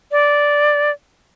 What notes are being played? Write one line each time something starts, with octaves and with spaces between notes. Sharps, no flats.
D5